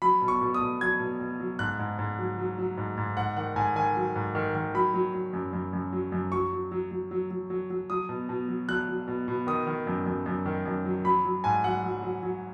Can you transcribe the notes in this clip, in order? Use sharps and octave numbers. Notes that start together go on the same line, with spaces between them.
F#3 B5
B2
C#6
B2
D#6
B2
F#3 G#6
B2
B2
F#3
G#2 F#6
G#2
G#2
F#3
F#3
F#3
G#2
G#2
G#2 F#5
D#3 F#5
G#2 G#5
D#3 G#5
F#3
G#2
D#3
D#3
F#3 B5
F#3
F#3
F#2
F#2
F#2
F#3
F#2
F#3 C#6
F#3
F#3
F#3
F#3
F#3
F#3
F#3
F#3 D#6
B2
B2
F#3
F#3 F#6
F#3
B2
B2
D#3 D#6
D#3
F#2
F#2
F#2
D#3
F#2
F#3
F#3 B5
F#3
G#2 G#5
F#3 F#5
F#3
F#3
F#3